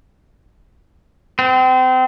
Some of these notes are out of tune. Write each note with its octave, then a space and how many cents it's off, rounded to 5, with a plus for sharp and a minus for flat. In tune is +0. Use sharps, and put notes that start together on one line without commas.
C4 -30